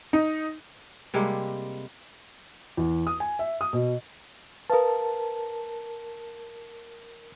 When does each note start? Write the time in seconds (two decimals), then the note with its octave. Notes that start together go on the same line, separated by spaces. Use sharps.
0.13 D#4
1.14 C3 G3 G#3 A#3
2.77 E2
3.07 D#6
3.20 G#5
3.39 E5
3.61 D#6
3.73 B2
4.70 A#4 B4 F5 A5 D#6